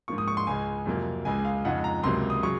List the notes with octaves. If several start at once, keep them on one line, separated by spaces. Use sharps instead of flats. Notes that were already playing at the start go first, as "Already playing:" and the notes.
G#2 F3 A#3 F4 C#6
D#6
C#6
C6
C#2 C#3 G#3 G#5
F2 C3 F#3 A#3
C#2 C#3 G#3 G#5
F5
F2 C#3 G#3 D#4 F#5
A#5
C#2 C3 F#3 A#3 C6
D#6
C#3 F#3 C#6